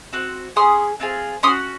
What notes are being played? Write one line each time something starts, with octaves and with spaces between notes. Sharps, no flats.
C4 F#4
C#4 G#4 C6 D#6
C4 F4 G#4
C#4 F#4 C6 D#6